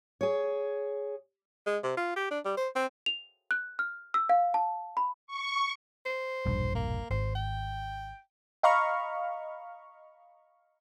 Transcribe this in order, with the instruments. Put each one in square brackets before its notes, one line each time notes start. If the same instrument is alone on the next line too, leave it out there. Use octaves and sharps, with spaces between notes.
[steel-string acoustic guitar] G#4 C#5
[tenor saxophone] G#3
C3
F4
G4
D4
G3
C5
C4
[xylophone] F7
F#6
F6
E6
F5
A5
B5
[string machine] C#6
[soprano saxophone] C5
[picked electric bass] E1 A#1 G2
[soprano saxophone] A#3
[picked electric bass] G#1 [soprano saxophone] C5
[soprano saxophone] G5
[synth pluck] D#5 F5 A#5 B5 C#6 F6